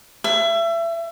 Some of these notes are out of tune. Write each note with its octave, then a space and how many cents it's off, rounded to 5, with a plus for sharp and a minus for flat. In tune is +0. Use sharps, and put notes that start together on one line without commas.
E5 +30